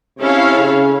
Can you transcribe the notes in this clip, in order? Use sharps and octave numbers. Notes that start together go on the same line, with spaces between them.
C3 C#4 E4 A4 C#5 F5
C#3